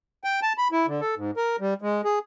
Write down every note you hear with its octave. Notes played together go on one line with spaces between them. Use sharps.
G5
A5
B5
E4
D3
A4
G#2
A#4
G3
G#3
G#4